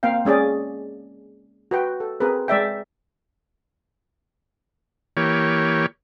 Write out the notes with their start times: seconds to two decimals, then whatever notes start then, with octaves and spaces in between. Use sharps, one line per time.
0.03 A#3 C4 F5 G5
0.25 G#3 C#4 G#4 D5
1.71 F#4 B4 G5
2.00 A4
2.20 C4 G#4 A#4 B4
2.48 G#3 D5 E5 G5
5.17 E3 A#3 G4 C#5